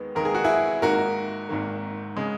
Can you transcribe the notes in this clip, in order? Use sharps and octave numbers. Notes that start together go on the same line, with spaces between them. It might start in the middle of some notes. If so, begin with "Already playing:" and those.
Already playing: D#2 D#3 G#3 B3
D#2 D#3 G#3 B3 A#4
G#4
F#4
E4 G#4
G#1 G#2 D#3 A#3 F#4 A#4
G#1 G#2 D#3 A#3
C#3 G#3